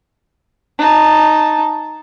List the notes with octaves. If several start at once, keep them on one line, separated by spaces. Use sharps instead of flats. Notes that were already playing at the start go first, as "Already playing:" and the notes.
D#4 A5